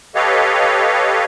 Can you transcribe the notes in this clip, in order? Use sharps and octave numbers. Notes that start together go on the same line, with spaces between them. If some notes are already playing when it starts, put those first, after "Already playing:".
G4 A4 B4 C#5 D#5 F5